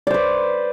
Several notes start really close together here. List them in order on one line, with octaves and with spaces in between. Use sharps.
D5 C5 B4